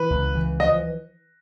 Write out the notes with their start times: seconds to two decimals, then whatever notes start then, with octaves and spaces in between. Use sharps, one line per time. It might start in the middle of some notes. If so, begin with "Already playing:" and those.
Already playing: E3 B4
0.10 C#2
0.35 E3
0.60 F3 D#5